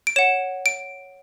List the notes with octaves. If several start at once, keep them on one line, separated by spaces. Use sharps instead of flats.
D7
C#5 F#5 E7
D7